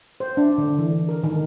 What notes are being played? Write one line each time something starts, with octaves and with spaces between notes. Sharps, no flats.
C5
D4
D3
E3
A#4
D#3